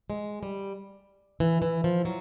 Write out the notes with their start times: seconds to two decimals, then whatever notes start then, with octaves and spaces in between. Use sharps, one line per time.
0.10 G#3
0.43 G3
1.40 E3
1.62 E3
1.84 F3
2.05 F#3